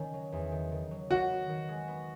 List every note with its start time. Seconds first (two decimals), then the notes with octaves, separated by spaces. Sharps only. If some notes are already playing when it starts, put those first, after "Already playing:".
Already playing: D#3 C#4
0.14 F#3
0.32 E2
0.52 D#3
0.72 D#3
0.91 F#3
1.10 D#3 F#4
1.30 B3
1.49 D#3
1.69 G#3
1.88 B3